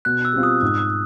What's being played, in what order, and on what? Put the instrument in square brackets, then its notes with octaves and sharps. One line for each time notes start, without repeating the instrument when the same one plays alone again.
[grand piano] B2 [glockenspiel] F#6
[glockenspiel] E6
[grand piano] G3 C4 F4
[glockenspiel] D#6
[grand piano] G#2